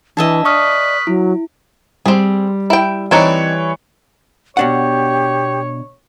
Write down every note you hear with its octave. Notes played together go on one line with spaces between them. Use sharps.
E3 D4 D#5 E5 A5
B4 D5 C#6 D#6 F6
F#3 E4
G3 C4 G#4
E4 G5
E3 C4 D4 D#4 C#5 C#7
B2 D4 G4 C#5 F#5